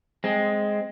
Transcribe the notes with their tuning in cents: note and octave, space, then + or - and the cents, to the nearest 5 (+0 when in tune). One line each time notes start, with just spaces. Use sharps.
G#3 +0 C4 +0